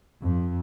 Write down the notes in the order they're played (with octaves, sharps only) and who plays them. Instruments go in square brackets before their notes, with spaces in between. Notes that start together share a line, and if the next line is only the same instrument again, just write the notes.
[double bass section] F2